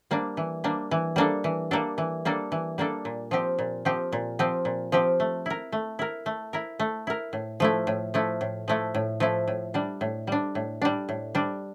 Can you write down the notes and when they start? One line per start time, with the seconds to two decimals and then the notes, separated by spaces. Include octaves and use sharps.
0.11 G3 A#3 D4
0.37 E3
0.64 G3 A#3 D4
0.91 E3
1.16 G3 A#3 D4 A4
1.44 E3
1.71 G3 A#3 D4 A4
1.98 E3
2.25 G3 A#3 D4 A4
2.52 E3
2.78 G3 A#3 D4 A4
3.05 A#2
3.31 F3 C4 G4
3.59 A#2
3.85 F3 C4 G4
4.12 A#2
4.39 F3 C4 G4
4.65 A#2
4.92 F3 C4 G4
5.20 A3
5.46 E4 A#4
5.72 A3
5.99 E4 A#4
6.26 A3
6.53 E4 A#4
6.80 A3
7.07 E4 A#4
7.33 A2
7.60 F3 A3 E4
7.87 A2
8.14 F3 A3 E4
8.41 A2
8.68 F3 A3 E4
8.94 A2
9.20 F3 A3 E4
9.47 A2
9.74 G3 D4
10.01 A2
10.27 G3 D4
10.55 A2
10.82 G3 D4
11.09 A2
11.35 G3 D4